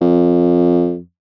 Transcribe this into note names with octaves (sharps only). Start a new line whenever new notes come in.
F2